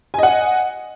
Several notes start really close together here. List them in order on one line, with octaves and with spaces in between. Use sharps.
G#5 D#5 F#5